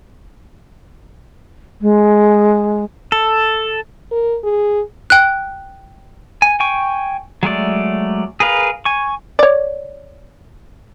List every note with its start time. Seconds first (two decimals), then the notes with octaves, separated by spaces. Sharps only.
1.81 G#3
3.12 A4
4.12 A#4
4.44 G#4
5.10 G5 F#6
6.42 G#5
6.60 G5 G#5 C#6
7.43 F#3 G#3 A3 D5
8.40 G#4 A#4 B4 F5
8.85 G#5 C#6
9.39 C#5 D5